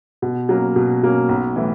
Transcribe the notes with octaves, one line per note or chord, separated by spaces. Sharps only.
B2
F#3 A#3 C#4
B2
F#3 A#3 C#4
B1
A2 E3